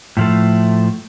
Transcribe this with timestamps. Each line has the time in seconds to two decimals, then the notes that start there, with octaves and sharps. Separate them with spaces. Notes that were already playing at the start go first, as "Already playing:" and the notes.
0.17 A2 F3 A3